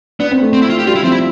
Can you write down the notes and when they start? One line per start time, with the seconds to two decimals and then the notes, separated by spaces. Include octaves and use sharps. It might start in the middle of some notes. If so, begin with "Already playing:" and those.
0.20 B3 D4
0.31 C4
0.41 A3
0.53 C4
0.62 E4
0.70 F4
0.79 G4
0.87 G3 F4
0.95 E4
1.04 F3 C4
1.12 E4